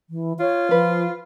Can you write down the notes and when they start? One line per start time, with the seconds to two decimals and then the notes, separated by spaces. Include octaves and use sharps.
0.10 E3
0.40 F4 C#5
0.71 F3 B4